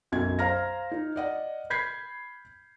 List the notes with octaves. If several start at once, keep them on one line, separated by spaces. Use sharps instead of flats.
B1 F#2 G#6
C5 F5 A#5 F6 A#6
D#4
D5 D#5 F#5
B5 G6 G#6 B6 C7